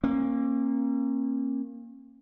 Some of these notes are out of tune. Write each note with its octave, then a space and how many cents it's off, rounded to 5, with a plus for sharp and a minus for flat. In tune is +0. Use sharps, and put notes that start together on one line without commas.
A#3 +0 C#4 -40